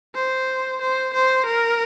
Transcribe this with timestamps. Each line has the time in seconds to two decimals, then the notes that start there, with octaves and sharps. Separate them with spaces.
0.15 C5
0.81 C5
1.14 C5
1.46 A#4